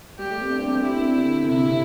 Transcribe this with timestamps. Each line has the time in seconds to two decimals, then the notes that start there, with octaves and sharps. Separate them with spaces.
0.19 G3 G4
0.30 A3
0.41 C4
0.51 D4
0.59 C4
0.68 D4
0.76 C4
0.84 D4 E4
1.00 C4
1.16 D3
1.44 D3
1.48 C3 E4
1.65 C3